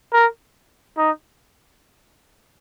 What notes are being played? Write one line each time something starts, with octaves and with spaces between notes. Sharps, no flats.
A#4
D#4